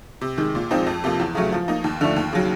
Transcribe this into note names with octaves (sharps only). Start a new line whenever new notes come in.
C3
D#3 G#3
A#2
F3 G#3 C4 D#4
F2
C3 F3 A#3
E2
C#3 F#3 A3
F3
A#3 D#4
D#2
D3 F3 A3
D#2
C#3 F#3